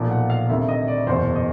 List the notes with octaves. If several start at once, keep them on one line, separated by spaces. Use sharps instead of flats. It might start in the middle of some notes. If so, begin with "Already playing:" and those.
Already playing: B1 A#2 F3
F#5
F5
D2 C3 D#3 E5
D#5
D5
F#1 E2 B2 C5
D#5